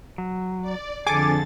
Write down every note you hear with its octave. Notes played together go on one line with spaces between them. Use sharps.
F#3
D5
F2 D3 G#4 A4 G#5 D6 A6